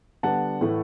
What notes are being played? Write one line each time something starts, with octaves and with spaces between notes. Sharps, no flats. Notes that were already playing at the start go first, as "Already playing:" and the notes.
D3 G3 B3 D4 F#5 A5
A2 E3 A3 E4